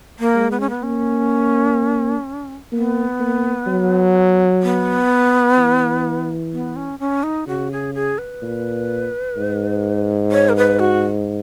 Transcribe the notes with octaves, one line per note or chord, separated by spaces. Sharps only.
A#3
G#3
B3
C#4
B3
A#3 C#4
A#3 B3
A#3
F#3
B3
E3
B3
C#4
C#4
D#4
C#3 F#4
G#4
G#4
B4
A#2
G#2
C#5
A#4
B4
F#4